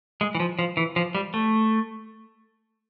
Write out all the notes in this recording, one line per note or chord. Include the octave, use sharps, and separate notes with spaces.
G#3
E3
F3
F3
E3
F3
G3
A3